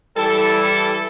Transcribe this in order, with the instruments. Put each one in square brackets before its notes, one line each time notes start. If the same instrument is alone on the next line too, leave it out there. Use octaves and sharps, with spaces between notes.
[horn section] E3 G3 E4 A4